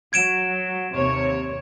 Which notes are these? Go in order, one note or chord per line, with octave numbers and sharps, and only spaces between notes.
F#3 G#6 D7 E7
D#2 C3 C#5